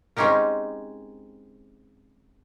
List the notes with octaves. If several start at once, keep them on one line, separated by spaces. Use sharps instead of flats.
G#3 C4 C#4 D#4 G4 A#4